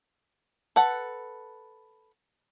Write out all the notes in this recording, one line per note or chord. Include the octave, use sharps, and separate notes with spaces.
A4 B4 F#5